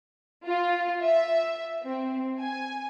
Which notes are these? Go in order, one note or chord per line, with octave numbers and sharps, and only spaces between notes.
F4
E5
C4
G#5